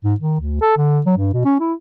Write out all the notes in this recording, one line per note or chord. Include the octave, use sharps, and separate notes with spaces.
G#2
D#3
D2
A4
D3
F#3
G2
B2
C#4
E4